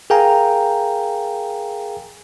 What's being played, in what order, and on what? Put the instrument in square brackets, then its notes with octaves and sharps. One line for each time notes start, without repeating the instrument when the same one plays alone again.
[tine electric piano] G#4 A#4 F5 G5 G#5 A#5